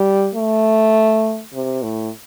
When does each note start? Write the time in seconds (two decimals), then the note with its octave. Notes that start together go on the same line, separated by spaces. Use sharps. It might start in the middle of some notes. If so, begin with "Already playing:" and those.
Already playing: G3
0.35 A3
1.54 C3
1.83 A2